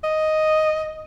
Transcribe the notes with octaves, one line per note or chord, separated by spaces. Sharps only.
D#5